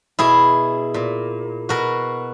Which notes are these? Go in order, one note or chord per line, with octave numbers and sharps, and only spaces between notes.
B2 E4 G#4
A#2
B2 F#4 A#4